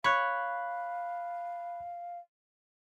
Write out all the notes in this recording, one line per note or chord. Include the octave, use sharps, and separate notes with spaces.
C#5 F5 B5 F#6